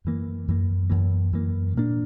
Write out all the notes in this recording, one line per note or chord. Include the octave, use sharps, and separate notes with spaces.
F#2 E3 A#3
F#2 E3 A#3
F#2 E3 A#3
F#2 E3 A#3
A#2 A#3 D4